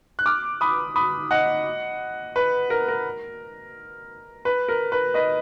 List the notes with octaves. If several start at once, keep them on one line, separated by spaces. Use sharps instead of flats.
F#6
D6 F6
B5 D#6
B5 D#6
D#5 F#5
B4
A#4
A#4
B4
A#4
B4
B4 D#5